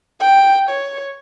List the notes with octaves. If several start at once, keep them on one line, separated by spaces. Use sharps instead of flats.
G5
C#5